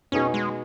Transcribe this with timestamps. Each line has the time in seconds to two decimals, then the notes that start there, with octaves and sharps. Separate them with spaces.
0.12 B2 B3 C#4 D#4 G#4
0.34 G#3